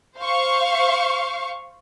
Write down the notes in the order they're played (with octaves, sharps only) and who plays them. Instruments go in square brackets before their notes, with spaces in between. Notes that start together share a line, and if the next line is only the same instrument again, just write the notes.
[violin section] C5 F5 C#6